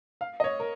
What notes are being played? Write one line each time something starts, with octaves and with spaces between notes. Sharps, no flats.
F5
D#5
C#5
A#4